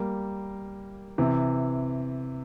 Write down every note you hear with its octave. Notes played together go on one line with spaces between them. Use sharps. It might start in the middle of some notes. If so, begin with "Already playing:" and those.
Already playing: G3 A#3
C3 E3